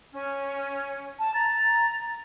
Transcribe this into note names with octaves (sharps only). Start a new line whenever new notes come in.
C#4
A5
A#5 A6